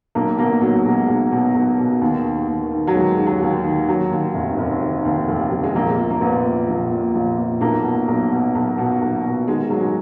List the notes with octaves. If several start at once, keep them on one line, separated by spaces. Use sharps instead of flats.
B1 A#3
B2 A#3
B1 F#3
B2 G#3
B1
B2
B1
B2
D#2
D#3
D#2
D#3
F#3
D#2 G#3
D#3
F#3
D#2
D#3
D#3 F#3
D#2
F1
F1
D#3
D#2
F1
F1
G#3
A#1 A#3
A#2
A#3
A#1 B3
A#2
A#1
A#2
A#1
A#2
B1 A#3
B2
B1
B2
B1
B2
B1
B2
D#3 G#3
G#2 F#3
G#3